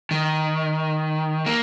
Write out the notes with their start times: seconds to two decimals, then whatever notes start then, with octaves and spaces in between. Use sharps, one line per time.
0.11 D#3
1.46 A#3